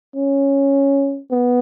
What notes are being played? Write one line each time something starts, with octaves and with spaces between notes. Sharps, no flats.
C#4
B3